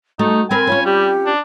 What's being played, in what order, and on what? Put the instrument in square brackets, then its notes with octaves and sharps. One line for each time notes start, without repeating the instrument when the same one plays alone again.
[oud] A3 [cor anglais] D#4 [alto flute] F#4
[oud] C4 A#4 B4 [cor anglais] G#5 [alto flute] B5
[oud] C#4 F4 B4 [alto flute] C#5
[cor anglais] G3 [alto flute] G4
[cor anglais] D4